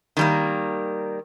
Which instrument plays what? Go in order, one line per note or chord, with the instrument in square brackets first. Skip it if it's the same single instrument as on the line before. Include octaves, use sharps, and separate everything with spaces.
[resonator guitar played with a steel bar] D#3 G3 A#3